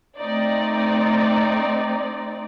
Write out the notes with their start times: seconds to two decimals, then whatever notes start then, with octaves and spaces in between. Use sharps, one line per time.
0.18 A3 C4 D#4 D5